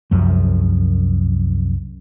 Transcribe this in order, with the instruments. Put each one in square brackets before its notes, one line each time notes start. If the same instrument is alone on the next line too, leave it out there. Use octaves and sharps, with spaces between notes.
[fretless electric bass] C2 F#2 F3